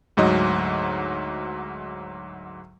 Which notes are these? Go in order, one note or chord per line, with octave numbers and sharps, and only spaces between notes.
D2 G#2 F#3 D#5